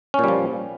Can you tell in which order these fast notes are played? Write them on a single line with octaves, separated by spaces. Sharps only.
C#4 A#2 G3 F3